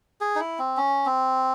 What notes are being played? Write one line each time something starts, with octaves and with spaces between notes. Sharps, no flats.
G#4
D#4
E4
C4
C#4
C4